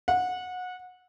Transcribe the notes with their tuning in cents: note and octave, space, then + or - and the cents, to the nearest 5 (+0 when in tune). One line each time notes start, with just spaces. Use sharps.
F#5 -25